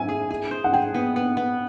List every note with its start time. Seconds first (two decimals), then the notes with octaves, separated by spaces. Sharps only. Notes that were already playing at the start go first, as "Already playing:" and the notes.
Already playing: E4 G#5
0.08 G#4
0.31 G#4
0.51 C5
0.64 F#5
0.73 G#4 G5
0.94 B3
1.16 B3
1.37 B3